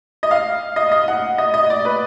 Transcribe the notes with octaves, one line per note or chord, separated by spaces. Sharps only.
D#5
F5
D#5
D#5
F#5
D#5
D#5
D5
B4